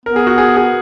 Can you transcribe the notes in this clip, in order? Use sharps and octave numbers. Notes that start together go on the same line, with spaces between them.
B3 A#4
G#4
F#4
G#4
G#4